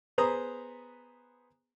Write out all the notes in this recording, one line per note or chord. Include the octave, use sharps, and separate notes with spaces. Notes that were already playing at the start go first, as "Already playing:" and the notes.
B3 G#4 B4 C5 A#5 D#6